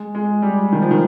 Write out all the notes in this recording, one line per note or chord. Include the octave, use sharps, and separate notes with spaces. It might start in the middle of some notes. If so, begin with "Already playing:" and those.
Already playing: G#3
G#3
G3
D#3
F3
D#3